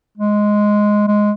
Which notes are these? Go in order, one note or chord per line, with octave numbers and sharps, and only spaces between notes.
G#3
G#3